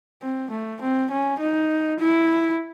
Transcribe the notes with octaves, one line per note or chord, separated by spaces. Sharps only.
C4
A3
C4
C#4
D#4
E4